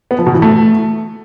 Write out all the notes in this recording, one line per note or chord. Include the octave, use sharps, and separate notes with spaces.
B3
F3
B2
E3
A3